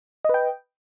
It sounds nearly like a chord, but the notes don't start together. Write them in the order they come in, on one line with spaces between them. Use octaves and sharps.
D#5 B4 G5